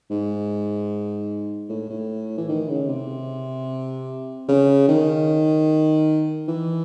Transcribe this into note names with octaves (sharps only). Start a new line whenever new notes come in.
G#2
A2
A2
E3
D#3
C#3
C3
C#3
D#3
E3